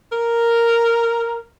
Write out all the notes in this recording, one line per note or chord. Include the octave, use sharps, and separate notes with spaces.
A#4